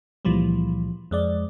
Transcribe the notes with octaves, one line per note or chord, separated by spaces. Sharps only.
C#2 A#2 E3 F3 G3
F2 G#3 D5